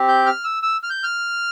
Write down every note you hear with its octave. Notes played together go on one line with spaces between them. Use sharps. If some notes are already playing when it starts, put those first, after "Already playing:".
Already playing: C4 G4
G6
F6
E6
E6
F6
G6
F6